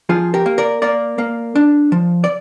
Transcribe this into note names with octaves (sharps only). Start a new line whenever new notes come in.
F3 F4 G#4
G4 A#4
A#3
A#4 D5
A#3 A#4 D5
A#3
D4
F3
D5